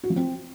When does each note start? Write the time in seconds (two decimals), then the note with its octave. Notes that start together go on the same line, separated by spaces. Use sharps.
0.04 F#4
0.10 F3
0.16 C4